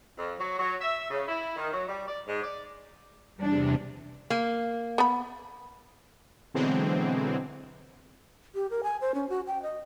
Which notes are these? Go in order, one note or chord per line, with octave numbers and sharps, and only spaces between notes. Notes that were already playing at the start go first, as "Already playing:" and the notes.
F2
F#3
F#3
E5
C#3
E4
D#3
F#3
G3
D5
G#2
D5
E2 C3 G3 D4
A#3
B3 B5
B2 D3 E3 F#3 G#3 C4
G4
A#4
G#5
C5
C#4
F#4
G5
D#5